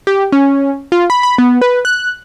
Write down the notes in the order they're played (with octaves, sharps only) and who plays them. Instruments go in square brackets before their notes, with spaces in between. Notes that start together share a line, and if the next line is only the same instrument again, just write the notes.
[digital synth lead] G4
C#4
F4
B5
B5
B3
B4
F#6